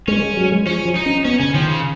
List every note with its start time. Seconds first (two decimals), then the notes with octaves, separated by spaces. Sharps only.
0.08 G#3 C#4
0.23 G#3
0.37 F#3
0.52 G#3
0.66 F3 C#4
0.85 F3
0.96 D#4
1.06 C#4
1.25 B3 C#4
1.40 C#3 C#4
1.55 D#3 F3
1.69 C#3